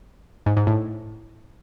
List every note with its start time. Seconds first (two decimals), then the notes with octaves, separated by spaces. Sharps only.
0.46 G#2
0.57 G#2
0.67 A2